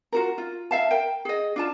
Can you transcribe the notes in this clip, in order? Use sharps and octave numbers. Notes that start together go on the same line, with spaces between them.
F4 F#4 A#4
F4
E5 F5 A5
A#4 G5
G#4 D#5
D4 F4 A5